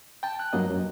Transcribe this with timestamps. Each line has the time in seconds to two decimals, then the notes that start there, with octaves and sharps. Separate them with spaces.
0.23 G5 A5
0.39 F#6
0.53 G2 F#3 A#3 D#5
0.71 F#2